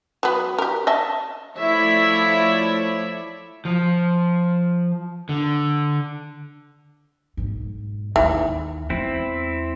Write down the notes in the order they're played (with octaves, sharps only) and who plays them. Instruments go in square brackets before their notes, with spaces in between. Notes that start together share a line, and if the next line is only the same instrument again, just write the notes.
[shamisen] F#3 B3
G4 A#4
D#5 E5 A5
[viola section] F3 A3 E4 C#5 D5 E5
[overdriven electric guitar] F3
D3
[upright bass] B1 G#2
[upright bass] D#2 D#4 [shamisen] E3
[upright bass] E2 G#3 [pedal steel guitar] C4 E4